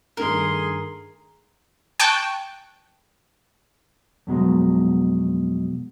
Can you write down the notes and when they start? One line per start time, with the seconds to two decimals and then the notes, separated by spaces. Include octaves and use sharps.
0.17 G2 D#3 A3 G#4 A#4 C6
2.00 G5 A5 C#6 F#6 G6
4.27 F2 B2 F#3 G#3